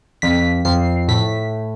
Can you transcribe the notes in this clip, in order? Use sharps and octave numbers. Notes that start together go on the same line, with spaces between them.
F2 B6
F2 C7
A2 B6